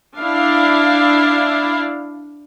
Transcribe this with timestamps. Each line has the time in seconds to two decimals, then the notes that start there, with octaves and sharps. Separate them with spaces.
0.18 D4 E4 F5